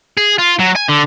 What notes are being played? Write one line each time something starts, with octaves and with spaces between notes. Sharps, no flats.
G#4
F4
F#3
G#5
D3